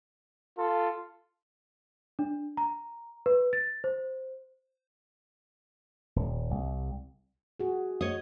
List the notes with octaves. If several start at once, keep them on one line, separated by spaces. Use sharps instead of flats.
F4 A4
D4
A#5
B4
A6
C5
D#1
C2
F#4 G#4
C#5 D#5